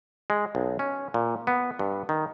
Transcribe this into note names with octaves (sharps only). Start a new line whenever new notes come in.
G#3
B1
C#4
A#2
B3
G2
D#3